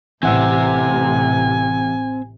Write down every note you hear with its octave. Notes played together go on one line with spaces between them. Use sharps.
A1 C3 E3 C4 E5 F#5 G#5 E6